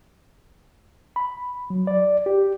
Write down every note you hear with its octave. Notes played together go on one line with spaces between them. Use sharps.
B5
F#3
D5
G4